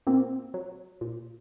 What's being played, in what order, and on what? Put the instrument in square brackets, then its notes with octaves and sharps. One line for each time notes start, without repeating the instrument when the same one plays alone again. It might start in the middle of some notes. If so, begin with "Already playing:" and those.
[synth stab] A#2 A#3 C4
F#3
A#2